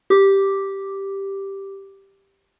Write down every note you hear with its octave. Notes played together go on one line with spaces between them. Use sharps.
G4 D6